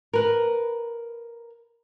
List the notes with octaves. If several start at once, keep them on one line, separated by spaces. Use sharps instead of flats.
A#4 B4